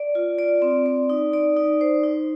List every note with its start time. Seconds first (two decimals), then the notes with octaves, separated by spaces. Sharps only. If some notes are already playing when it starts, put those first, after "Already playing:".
Already playing: D5
0.15 F4
0.38 D5
0.62 C4
0.86 D5
1.10 D#4
1.33 D5
1.57 D#4
1.81 C5
2.03 D#4